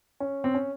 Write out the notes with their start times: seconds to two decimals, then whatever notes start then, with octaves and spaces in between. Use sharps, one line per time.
0.20 C#4
0.44 C4
0.55 C#4